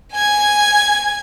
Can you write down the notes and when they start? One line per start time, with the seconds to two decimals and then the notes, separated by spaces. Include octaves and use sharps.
0.13 G#5 G#6